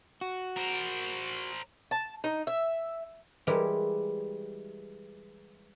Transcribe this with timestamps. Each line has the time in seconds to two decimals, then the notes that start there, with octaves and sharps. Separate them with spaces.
0.21 F#4
0.56 A#4 C5
1.91 A5
2.24 D#4
2.47 E5
3.47 E3 G3 G#3 G4 A#4